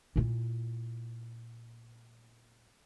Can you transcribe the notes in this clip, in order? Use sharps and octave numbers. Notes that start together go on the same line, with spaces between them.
A#2 E4